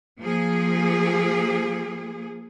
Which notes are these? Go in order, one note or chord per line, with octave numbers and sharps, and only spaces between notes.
F3 A#3 G#4